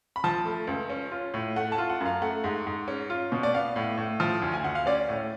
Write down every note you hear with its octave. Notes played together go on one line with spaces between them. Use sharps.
B5
F3 A5
A3
C#2
C#4
F4
A2
A3 F#5
A5
F4
F#5
F#2
F5
A3 F#5
G#2
G#2
C#4
F4
B2
D5
B3 F5
A2
A2
F3
D2
G#5
D2 F#5
F5
C#4 D5
A2